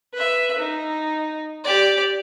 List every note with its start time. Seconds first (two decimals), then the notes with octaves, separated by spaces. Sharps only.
0.14 B4 E5
0.58 D#4
1.64 G4 D5